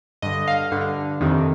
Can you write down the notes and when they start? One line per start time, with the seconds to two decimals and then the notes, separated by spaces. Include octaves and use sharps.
0.22 G2 D3 D#5
0.48 F5
0.72 G2 D3
1.21 F2 C3 D#3